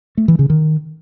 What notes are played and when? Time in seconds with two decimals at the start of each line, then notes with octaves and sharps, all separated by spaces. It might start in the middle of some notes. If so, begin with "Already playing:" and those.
0.17 A3
0.28 E3
0.39 C#3
0.50 D#3